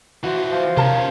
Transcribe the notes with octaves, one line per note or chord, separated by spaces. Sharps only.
E3 F#4 C5
F3
C3 C#4 A#4 C5 A5